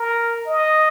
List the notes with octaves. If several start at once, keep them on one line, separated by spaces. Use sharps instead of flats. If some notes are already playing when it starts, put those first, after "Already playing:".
Already playing: A#4
D#5